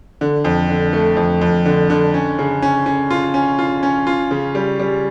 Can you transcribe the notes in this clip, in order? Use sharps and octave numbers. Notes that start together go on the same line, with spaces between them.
D3
F2
D3
A3
F2
F2
D3
D3
C#4
C#3
C#4
C#4
F4
C#4
F4
C#4
F4
C#3
G3
G3